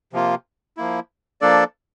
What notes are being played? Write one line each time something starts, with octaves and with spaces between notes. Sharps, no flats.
C3 F3 A#3 F4
F3 A#3 E4
F3 A#3 D4 A4 D5